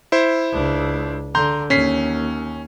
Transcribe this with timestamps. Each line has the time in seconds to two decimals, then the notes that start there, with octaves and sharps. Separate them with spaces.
0.12 E4 C5
0.53 C#2 D4
1.35 D3 A#5 C6 G6
1.70 D#2 C#4 B6 C7